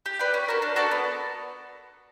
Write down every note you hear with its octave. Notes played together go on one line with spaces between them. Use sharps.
G4
B4 D5 G5
C#4
F#4 A#4
D4
F#4 A4 D5
B3